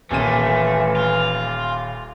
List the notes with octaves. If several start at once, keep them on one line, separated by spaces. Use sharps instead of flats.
D#1 A#2 E3 A3 D#7
F4